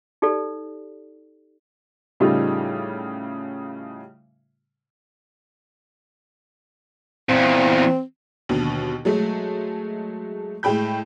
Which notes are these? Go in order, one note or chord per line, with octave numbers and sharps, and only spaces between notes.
D#4 G4 A4 D5
A2 C#3 G3 A3 D#4 F4
E2 A#2 C4
D#2 B2 D3
F#3 G#3 A3
A2 G#3 G5 B5 G6